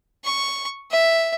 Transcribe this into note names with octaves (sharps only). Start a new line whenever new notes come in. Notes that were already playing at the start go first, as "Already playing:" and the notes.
C#6
E5